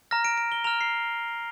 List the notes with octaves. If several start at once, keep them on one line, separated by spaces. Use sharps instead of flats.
A#5 F6 A#6
D7
D7
G7
A#5 F6 F7
C7